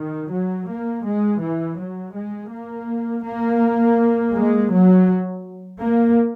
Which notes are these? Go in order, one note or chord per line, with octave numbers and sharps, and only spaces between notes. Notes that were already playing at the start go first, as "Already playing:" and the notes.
Already playing: D#3
F#3
A#3
G#3
E3
F#3
G#3
A#3
A#3
G#3
F#3
A#3